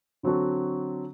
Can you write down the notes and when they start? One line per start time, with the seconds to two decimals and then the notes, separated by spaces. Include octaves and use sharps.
0.23 D3 F#3 C4 F#4 A4